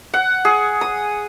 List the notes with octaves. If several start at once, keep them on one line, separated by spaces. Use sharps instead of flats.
F#5
G#4
D#6